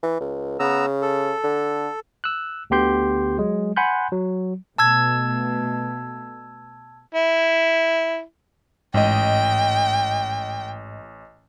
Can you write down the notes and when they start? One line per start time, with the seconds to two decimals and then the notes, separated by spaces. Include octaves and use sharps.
0.03 E3
0.21 C#2
0.60 C#3 B3 A#5 E6
1.02 A4
1.44 D3
2.24 E6 F#6
2.70 D2 D3 B3 G4 C6 G6
3.38 F#3 G#3
3.76 F#5 G#5 B5 C6 F#6 G6
4.12 F#3
4.78 B2 A3 A5 E6 G#6
7.15 E4
8.94 A1 G#2 D#5 G5